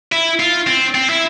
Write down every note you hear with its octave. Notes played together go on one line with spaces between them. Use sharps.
E4
F4
C4
C4
E4